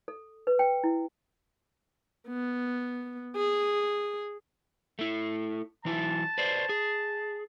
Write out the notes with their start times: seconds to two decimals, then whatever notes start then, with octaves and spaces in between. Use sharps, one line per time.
0.08 A4
0.47 B4
0.59 G5
0.84 E4
2.28 B3
3.36 G#4
4.99 A3 E4
5.85 E3 F#3 E4 A5
6.38 B4 C5 D5
6.69 G#4